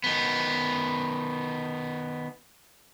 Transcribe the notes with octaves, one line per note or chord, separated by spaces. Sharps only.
D#3 B3